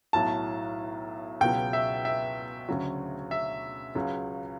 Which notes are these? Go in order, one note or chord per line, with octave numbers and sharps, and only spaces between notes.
B1 A2 F#3 A5
C#2 B2 F#3 G5
E5
E5
D2 C#3 F#3
E5
C#2 C#3 F#3